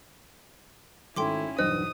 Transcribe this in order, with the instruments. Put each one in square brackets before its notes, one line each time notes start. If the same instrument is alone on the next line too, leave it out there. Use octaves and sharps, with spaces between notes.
[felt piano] G#1 A3 A4 [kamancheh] C#4 E4 [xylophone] G5 C6 D6
[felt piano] B1 E2 G2 [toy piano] C5 [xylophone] D#5 [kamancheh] D#6